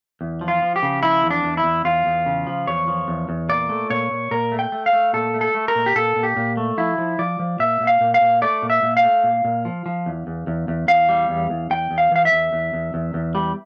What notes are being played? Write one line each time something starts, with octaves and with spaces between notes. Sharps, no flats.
E2
F3
F4
F3
G4
C#3
F3 E4
E2
D4
E2
E4
E2
E2 F4
E2
C#3
F3
E2 C#5
F3
E2
E2
A#2 D5
A3
A#2 C#5
A#2
A#2 A#4
A3
G5
A3
F5
A3
A#2 A4
A3
A4
A3
A#4
A#2
G4
A#2 A4
A#2
G4
A#2
A3
F3 E4
F3
F3 D5
F3
A#2 E5
A#2
F5
A#2
F5
A#2
A3 D5
A#2
E5
A#2
F5
A3
A#2
A#2
F3
F3
E2
E2
E2
E2
E2 F5
G3
E2
E2
E2 G5
E2
F5
E3 F5
E5
E2
E2
E2
E2
E2
G3